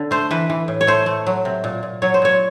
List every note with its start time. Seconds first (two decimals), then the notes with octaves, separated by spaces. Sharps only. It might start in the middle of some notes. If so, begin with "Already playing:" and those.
Already playing: D3
0.11 A3 C5
0.31 E3 B4
0.50 E3
0.68 A2
0.81 C#5
0.87 A3 C5
1.06 A3
1.27 F#3
1.45 C3
1.64 A#2
1.83 A#2
2.02 F#3 C#5
2.14 C5
2.22 A#2 C#5